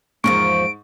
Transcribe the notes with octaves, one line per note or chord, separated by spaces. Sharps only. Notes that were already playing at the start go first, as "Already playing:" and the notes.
E2 G#2 F3 A#3 C#6 D7